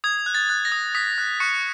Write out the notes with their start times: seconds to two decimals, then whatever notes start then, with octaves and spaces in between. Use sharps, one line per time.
0.04 D#6 G#6
0.26 F#6
0.35 A6
0.50 F#6
0.65 A#6
0.72 D#6
0.95 D#6 B6
1.18 F#6
1.40 C#6 F#6 C#7